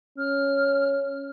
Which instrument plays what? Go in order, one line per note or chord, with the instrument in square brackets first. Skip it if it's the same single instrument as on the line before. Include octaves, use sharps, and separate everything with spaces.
[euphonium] C#4 [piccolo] F6